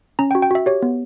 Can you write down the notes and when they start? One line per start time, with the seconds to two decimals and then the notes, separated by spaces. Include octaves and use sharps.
0.19 C#4 A#5
0.31 G5
0.35 F#4
0.42 G5
0.51 F#4 E5
0.66 G4 C#5
0.82 B3